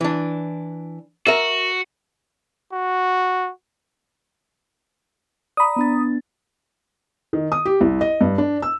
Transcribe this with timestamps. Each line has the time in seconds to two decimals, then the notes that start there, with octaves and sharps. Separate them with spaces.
0.01 E3 D4
1.27 F#4 A#4 E5
2.72 F#4
5.57 D5 A#5 B5 D#6
5.76 B3 D4 A6
7.33 D#3
7.52 D#6
7.65 G4
7.81 C2
8.01 D#5
8.21 G2
8.38 D4
8.62 E6